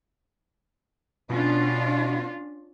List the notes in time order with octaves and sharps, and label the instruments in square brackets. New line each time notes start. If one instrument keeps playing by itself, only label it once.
[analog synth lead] B2 [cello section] C#4 D4 F4